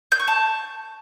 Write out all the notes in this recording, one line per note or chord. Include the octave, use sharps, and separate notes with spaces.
G6
C#6
A5